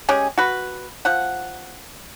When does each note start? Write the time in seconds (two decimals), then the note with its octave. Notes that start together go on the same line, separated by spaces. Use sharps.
0.09 G#3 C#4 G4 G#4
0.38 F#4 B4
1.05 F3 F#5